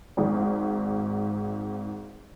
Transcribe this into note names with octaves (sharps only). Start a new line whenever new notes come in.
G#1 G#2